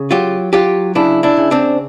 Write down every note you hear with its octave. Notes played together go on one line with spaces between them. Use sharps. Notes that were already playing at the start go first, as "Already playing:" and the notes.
Already playing: C#3
F#3 F4 G4
F#3 F4 G4
C#3 D4 E4
D4 E4
C#3
C4 D4